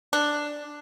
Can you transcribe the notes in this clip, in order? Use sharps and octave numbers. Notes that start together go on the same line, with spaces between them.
D4